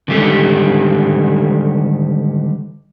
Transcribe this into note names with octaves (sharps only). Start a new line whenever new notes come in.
D3 D#3 G3 G#3 G4 A4